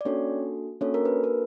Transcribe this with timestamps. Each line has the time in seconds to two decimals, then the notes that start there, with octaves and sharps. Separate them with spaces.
0.01 D5
0.05 A#3 C#4 D4 F#4 A4 C#5
0.81 A#3 C#4 D4 F#4 A4 C#5
0.94 A#4
1.05 B4
1.24 A#4